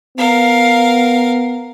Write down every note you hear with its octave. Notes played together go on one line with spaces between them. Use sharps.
B3 A#4 F5